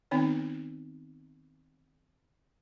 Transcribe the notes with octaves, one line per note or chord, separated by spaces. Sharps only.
D#3 B3 C4 D#4 C#5